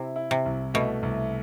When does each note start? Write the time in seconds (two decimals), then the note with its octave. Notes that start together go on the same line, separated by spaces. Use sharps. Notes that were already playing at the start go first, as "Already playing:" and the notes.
Already playing: C3 E4
0.16 E4
0.31 C3
0.46 C2
0.74 B2 A3
1.03 C2